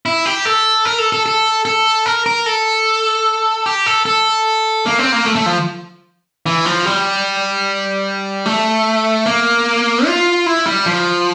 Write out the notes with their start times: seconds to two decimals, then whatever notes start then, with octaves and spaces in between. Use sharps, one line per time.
0.06 E4
0.26 G4
0.45 A4
0.85 A#4
0.99 A4
1.12 A4
1.26 A4
1.65 A4
2.06 A#4
2.26 A#4
2.46 A4
3.66 G4
3.86 A4
4.06 A4
4.86 A#3
4.99 C4
5.12 A#3
5.25 A3
5.36 A3
5.46 F3
6.46 E3
6.65 F3
6.85 G3
8.46 A3
9.26 A#3
10.06 F4
10.46 E4
10.66 G3
10.86 F3